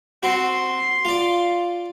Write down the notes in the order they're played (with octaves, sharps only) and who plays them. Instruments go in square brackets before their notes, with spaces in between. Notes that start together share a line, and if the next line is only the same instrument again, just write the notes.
[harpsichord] C4 F#4 [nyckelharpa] C6
[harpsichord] F4 D5